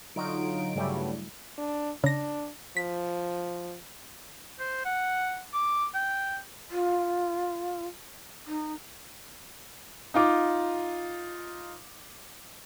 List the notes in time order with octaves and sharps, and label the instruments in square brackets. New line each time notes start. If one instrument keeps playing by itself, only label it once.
[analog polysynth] D3 F#3 D#4 F4 D7
G2 C#3 F#3 G3 A3 E4
[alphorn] D4
[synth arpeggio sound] C#3 A#6 [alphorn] D4
[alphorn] F3 [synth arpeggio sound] B6
[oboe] C5
F#5
D6
G5
[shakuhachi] F4
D#4
[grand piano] D#4 F4 D6